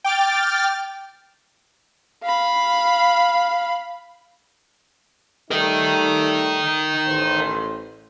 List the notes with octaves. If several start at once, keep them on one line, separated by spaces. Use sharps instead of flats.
G5 D6 F6 A6
F5 B5
G3 A3 D#4 A#4 D#5
A1 C5